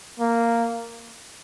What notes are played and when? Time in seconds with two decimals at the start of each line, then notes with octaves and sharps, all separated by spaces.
0.20 A#3